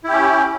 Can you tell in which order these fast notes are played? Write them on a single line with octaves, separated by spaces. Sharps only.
E4 G4 C#4